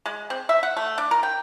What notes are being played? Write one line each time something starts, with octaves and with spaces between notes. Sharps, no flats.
G#3
C4
E5
F#5
A3
D4
A#4
G5